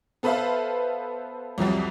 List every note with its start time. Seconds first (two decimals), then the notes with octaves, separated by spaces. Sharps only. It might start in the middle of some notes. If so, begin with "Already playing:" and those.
0.23 B3 A4 B4 C5 E5 F5
1.58 C2 F2 F#3 G3